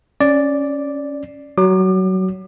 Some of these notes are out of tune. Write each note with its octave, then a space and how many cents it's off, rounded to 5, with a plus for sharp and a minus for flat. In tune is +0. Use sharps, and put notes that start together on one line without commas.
C#4 -5 D5 +0
F#3 +20 D6 +40